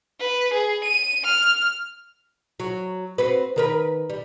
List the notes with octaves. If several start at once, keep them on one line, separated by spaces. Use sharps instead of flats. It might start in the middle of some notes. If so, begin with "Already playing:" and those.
B4
G#4
D#7
F6
F#3
C4 F#4 B4
D#3 A#4 B4
G3